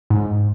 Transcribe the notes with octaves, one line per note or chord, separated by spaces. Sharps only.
G#2